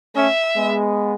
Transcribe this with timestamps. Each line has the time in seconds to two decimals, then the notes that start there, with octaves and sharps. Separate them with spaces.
0.15 A3 C#4 E5
0.55 G#3 B3